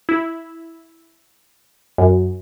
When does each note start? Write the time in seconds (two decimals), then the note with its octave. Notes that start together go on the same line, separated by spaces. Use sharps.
0.09 E4
1.98 F#2